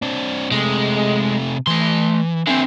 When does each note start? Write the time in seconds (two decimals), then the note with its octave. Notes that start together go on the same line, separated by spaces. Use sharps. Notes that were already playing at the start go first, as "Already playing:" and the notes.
0.02 C4 D4
0.52 C3 G#3 A3
1.67 E3 A3 C6
2.47 D3 C4 E5 G#5